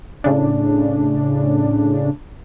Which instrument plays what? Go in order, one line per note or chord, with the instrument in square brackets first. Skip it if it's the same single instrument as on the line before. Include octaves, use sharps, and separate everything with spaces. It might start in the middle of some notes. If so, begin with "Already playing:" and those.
[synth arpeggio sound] A2 C#3 D4